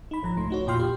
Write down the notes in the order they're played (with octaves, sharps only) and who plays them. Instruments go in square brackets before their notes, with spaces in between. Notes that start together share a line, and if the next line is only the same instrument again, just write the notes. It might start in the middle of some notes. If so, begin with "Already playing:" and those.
[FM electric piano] D#4 B5
G#1 F3 A#5
C2 G#2 A3 C6
D#4 F#4 C#5
F2 A#2 F4 G5 C6 F6
G4